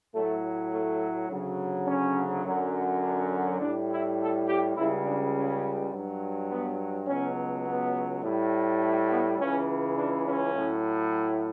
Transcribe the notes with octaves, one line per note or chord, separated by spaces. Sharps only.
A2 F#3 A3
A3
D2 C#3 F#3
C#4
F#2 D3 F#3
D4
A2 G3 D4
E4
A4
G4
C#2 C#3 G3 E4
D4
C#4
G2 F#3
B3
C#2 B2 F#3 C#4
B3
A2 G3
A3
B3
C#2 C#3 E3 C#4
D4
C#4
A2 F#3